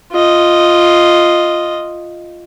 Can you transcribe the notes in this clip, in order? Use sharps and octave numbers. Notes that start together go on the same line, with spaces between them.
F4 D#5